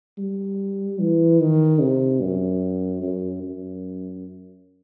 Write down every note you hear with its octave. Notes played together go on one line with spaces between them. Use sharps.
G3
E3
D#3
C3
F#2
F#2
F#2